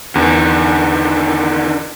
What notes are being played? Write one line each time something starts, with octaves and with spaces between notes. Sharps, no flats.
E2 D3 D#3